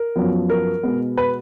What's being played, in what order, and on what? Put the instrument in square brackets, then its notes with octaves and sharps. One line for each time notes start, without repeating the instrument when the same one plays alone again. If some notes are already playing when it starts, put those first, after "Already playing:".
Already playing: [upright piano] A#4
F#2 F3 B3
A#4
B2 G#3 B3
B4